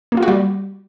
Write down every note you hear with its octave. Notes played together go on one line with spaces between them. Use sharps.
A#3
F4
F#4
G3